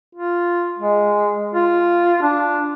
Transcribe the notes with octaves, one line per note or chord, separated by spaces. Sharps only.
F4
G#3
F4
D4